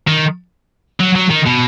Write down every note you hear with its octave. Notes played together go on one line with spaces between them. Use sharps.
D#3
F#3
F#3
D#3
B2